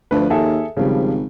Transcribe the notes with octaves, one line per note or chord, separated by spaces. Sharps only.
D2 F3 B4
D#2 G#4 A4 E5
G#1 C#3 F3 G3